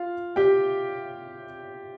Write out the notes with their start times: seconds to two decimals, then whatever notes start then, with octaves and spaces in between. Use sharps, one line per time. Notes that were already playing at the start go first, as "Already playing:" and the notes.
Already playing: F4 F5
0.36 G4 G5